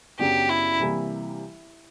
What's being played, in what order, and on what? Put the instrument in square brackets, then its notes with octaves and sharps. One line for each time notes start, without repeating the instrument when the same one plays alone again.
[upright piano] F#2 C#3 F#3 B3 D4 [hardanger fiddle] G4
[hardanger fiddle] E4
[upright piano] C3 E3 G3 A#3